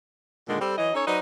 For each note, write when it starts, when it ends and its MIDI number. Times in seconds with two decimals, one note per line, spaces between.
0.48 0.59 46
0.48 0.59 50
0.48 0.59 51
0.48 0.59 56
0.60 0.77 55
0.60 0.77 60
0.60 0.77 69
0.77 0.92 52
0.77 0.92 54
0.77 0.92 75
0.94 1.04 61
0.94 1.04 63
0.94 1.04 69
0.94 1.04 73
1.06 1.19 54
1.06 1.19 63
1.06 1.19 71
1.06 1.19 72
1.06 1.19 74
1.06 1.19 75